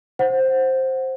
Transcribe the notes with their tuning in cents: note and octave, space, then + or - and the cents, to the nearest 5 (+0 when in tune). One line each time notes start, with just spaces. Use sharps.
C5 +5 F#5 -5